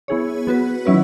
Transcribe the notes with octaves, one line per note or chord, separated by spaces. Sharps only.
B3 E4 G#4 C#5
B3 F#4 B4
D#3 F#3 C#4 E4 B4